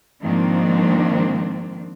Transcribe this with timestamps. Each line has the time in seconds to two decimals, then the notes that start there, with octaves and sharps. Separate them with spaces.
0.22 G#2 D#3 F3 A#3 C4 D4